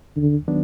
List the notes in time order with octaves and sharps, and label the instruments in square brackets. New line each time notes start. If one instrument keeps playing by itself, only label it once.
[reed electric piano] D#2 [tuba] D3
[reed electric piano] D#3 F#3 B3 D4